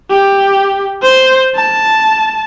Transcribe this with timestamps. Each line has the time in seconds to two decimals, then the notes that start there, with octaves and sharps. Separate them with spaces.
0.10 G4
1.02 C5
1.55 A5